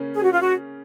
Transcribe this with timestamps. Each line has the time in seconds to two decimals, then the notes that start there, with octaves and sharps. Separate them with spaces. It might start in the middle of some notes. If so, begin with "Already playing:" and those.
Already playing: C#3 A#3 C#4
0.15 G#4
0.24 F#4
0.33 F4
0.42 F#4